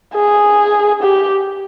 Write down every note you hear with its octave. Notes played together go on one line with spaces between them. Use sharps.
G#4
G4